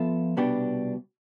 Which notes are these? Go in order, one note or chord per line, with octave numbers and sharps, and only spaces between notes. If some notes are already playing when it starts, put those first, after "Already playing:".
Already playing: F3 B3 F4 A4 E5
C2 B2 B3 D4 G4